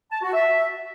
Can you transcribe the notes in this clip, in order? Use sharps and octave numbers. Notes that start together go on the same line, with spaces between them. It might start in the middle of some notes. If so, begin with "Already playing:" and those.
A5
F#4
E5